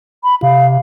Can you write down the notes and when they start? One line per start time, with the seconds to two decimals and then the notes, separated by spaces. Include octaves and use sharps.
0.24 B5
0.43 C3 F5